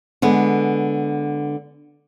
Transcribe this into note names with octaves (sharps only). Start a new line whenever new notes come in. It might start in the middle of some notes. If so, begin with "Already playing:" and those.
D3 G#3 B3